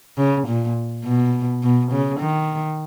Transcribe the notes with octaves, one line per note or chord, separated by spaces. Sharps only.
C#3
A#2
B2
B2
C#3
D#3